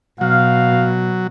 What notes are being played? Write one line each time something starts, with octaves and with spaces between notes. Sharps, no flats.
B2 F#3 F5